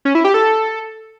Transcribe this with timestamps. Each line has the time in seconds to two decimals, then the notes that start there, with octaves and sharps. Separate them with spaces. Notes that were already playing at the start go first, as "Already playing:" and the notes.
0.05 C#4
0.15 E4
0.24 G4
0.34 A4